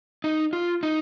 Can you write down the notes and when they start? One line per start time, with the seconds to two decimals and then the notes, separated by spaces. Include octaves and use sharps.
0.24 D#4
0.53 F4
0.83 D#4